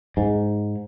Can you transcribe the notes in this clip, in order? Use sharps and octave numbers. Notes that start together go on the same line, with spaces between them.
G#2